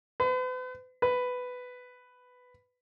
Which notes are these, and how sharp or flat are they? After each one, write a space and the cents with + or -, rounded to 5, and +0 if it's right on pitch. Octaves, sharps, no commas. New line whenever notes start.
B4 +45
B4 +10